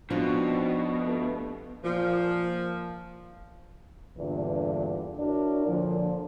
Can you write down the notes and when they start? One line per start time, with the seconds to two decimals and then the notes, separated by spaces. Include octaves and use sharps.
0.10 B2 F3 C4 D4 D#4 F4 F#4
1.00 G2 A3 B4
1.84 A#2 F3
4.18 E2 G2 A#2 D3 B4
5.20 D4 E4 F#4 A#4 C#5
5.67 A#2 D3 F3